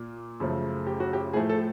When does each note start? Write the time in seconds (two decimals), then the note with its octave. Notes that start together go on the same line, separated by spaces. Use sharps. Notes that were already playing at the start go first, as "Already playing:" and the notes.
Already playing: A#2 A#3
0.40 F#2 C#3 F3 A3
0.87 G4
1.00 F#4
1.13 G4
1.33 A2 F3 A3 G#4
1.49 A4